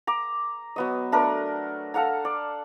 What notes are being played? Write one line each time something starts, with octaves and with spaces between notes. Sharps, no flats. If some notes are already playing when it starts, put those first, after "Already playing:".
A#5 D6
F#3 B3 D#5
A3 D4 A#4 B4
A4 F5 F#5 A#5
D5